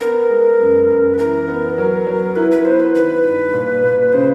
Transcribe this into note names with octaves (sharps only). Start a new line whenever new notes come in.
B3 A#4
G#3
F#2
F#2
B4
E3 A#4
B3
F#3
F#3
E4 B4
B4
B3 C5
B4
D#3 B4
G2
A#2
A#2
C#3 C5